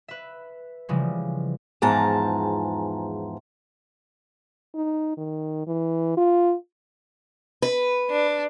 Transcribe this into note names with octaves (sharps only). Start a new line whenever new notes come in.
B4 E5
C#3 E3 F3 G3 G#3
E2 G#2 F3 A5 A#5
D#4
D#3
E3
F4
B4
D4